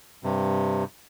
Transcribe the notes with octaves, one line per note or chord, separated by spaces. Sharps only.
G2 C3